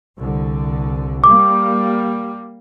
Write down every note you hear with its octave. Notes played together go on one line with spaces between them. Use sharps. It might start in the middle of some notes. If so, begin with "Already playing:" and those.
C2 D3
G3 A#3 D6